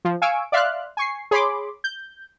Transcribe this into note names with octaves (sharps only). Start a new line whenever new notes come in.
F3
F5 G#5 C#6 E6 D7
D5 E5 F5 C6 F6 F#6
G#5 C#6 C7
G#4 C#5 B5 C6 D6
G6